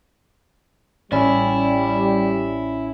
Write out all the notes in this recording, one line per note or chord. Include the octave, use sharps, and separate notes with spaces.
A1 G3 C#4 E4 D5 B5